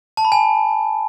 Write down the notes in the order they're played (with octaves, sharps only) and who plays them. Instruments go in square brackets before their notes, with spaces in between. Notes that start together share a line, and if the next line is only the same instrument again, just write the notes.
[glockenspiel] A5
B5
G#5